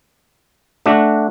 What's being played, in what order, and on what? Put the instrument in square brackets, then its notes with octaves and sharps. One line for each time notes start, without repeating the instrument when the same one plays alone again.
[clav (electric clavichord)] A3 D4 F#4